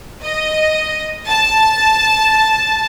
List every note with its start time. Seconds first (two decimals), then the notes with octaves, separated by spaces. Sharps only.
0.22 D#5
1.28 A5